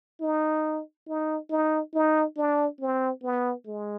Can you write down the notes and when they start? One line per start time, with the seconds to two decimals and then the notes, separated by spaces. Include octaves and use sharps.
0.21 D#4
1.07 D#4
1.50 D#4
1.94 D#4
2.37 D4
2.80 C4
3.23 B3
3.66 G#3